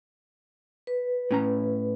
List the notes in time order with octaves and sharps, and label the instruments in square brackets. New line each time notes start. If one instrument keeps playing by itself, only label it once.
[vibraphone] B4
[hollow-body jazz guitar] A2 C#4 A#5